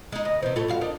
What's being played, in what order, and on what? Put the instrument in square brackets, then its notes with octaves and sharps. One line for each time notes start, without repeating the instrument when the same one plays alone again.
[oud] G#3 D#4
[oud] D2 [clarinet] D#5
[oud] C3 E3 [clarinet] C5
[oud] A2 A4 C#5 [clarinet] F4
[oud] G2 F#4 F5
D4 D#4 A#4